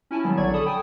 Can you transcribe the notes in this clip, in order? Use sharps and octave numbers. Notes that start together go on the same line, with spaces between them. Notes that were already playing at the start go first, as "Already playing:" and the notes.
C#4 E4 G#5 A5
D#3 F#3 G3 B3
A#1 D3 F#3 D5 C#6 G#6
A4 A5 B5 D#6
G5 G#5 D#6